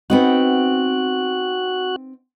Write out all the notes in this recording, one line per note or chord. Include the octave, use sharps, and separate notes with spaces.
B3 C4 D#4 F#4 F#6